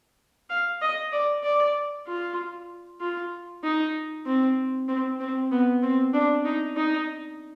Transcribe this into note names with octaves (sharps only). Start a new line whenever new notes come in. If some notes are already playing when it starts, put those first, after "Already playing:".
F5
D#5
D5
D5
F4
F4
D#4
C4
C4
C4
B3
C4
D4
D#4
D#4